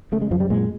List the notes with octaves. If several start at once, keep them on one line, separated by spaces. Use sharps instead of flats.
C#3 A3
G#3
F#2 F3
G3
A#2 G#3